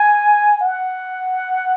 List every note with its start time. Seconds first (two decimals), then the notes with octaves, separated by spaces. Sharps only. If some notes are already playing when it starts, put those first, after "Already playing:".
Already playing: G#5
0.61 F#5